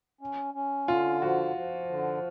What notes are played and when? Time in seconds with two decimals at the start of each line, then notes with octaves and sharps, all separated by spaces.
0.21 C#4
0.54 C#4
0.88 D3 F4
1.22 F3 F#4
1.56 F3
1.89 D3